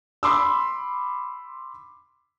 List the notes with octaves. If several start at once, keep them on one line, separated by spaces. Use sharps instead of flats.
B5 C6 D6 E6